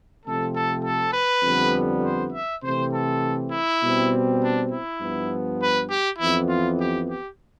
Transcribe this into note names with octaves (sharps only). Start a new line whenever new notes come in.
C3 F3 A3 C4 A4
A4
A4
B4
F2 D3 G3 B3
C5
E5
C3 E3 A3 C4 C5
A4
E4
B2 G3 C4
D4
E4
G2 F3 B3
B4
G4
F2 E3 B3 E4
F4
G4
G4